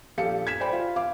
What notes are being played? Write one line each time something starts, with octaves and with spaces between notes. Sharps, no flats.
A#1 G4 A4 F5 C#7
G#6 B6 E7
C5 D5 G5 B5
F4
F5 D6